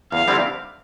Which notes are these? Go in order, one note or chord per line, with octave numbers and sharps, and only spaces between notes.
E2 F5
D3 G3 C4 E4